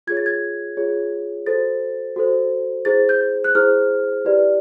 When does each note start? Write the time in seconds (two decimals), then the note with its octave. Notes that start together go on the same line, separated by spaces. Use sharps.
0.07 F4 G#4 C#5 G#6
0.17 A6
0.26 G#6
0.77 F4 G#4 C#5
1.46 F#4 A4 C5 A6
2.16 F#4 A4 C5
2.85 E4 G#4 C5 A6
3.09 G6
3.44 F#6
3.55 E4 G#4 C5 F6
4.25 E4 G4 B4 D5